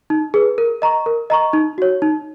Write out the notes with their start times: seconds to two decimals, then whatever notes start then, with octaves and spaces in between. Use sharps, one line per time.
0.10 D#4
0.34 G#4 B4
0.58 A#4
0.82 D#5 A#5 C#6
1.06 A#4
1.30 D#5 A#5 C#6
1.53 D#4
1.78 F#4 C#5
2.02 D#4